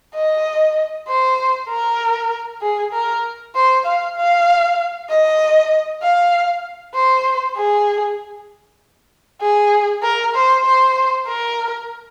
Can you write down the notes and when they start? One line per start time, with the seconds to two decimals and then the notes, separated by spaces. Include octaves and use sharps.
0.15 D#5
1.08 C5
1.69 A#4
2.62 G#4
2.93 A#4
3.55 C5
3.86 F5
4.16 F5
5.10 D#5
6.02 F5
6.94 C5
7.57 G#4
9.41 G#4
10.03 A#4
10.35 C5
10.64 C5
11.27 A#4